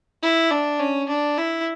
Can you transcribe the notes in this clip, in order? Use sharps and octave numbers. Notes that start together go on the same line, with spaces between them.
E4
D4
C#4
D4
E4